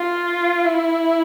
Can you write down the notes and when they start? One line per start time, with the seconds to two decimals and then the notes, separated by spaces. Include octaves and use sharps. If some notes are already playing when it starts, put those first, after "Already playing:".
Already playing: F4
0.65 E4